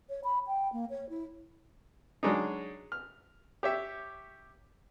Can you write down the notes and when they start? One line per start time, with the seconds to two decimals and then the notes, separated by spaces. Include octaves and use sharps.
0.09 C#5
0.24 B5
0.47 G5
0.73 A#3
0.90 C#5
1.09 E4
2.23 F#3 G#3 D4 D#4
2.92 F6
3.63 G4 C#5 E5